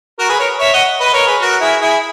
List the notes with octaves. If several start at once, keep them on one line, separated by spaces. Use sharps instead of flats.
F#4 A#4
G#4 B4
A#4 C#5
C#5 E5
D#5 F#5
B4 D#5
A#4 C#5
G#4 B4
F#4 A#4
E4 G#4
E4 G#4